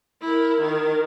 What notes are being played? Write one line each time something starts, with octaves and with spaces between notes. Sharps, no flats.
E4 A#4
D#3 A#4